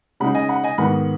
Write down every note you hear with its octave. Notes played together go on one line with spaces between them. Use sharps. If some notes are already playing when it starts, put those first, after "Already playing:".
C#3 G#3 D#4 F#5 B5
D#5 G#5
F#5 B5
D#5 G#5
G#2 D#3 B3 F#5 B5